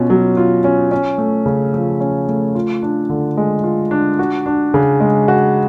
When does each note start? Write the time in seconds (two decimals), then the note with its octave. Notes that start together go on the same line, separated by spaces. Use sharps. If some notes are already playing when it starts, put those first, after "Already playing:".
Already playing: B2 C#4 F4
0.10 F#3
0.37 F4
0.64 C#4
0.91 C#4
1.18 A3
1.46 C#3
1.74 F3
2.00 C#4
2.28 A3
2.55 F4
2.82 D4
3.09 D3
3.37 G#3
3.64 F4
3.91 D4
4.19 F#4
4.46 D4
4.74 C#3
5.00 G#3
5.28 F#4